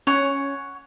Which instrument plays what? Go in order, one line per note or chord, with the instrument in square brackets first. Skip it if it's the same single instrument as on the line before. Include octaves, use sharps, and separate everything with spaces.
[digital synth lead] C#4 [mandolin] C#5 F#5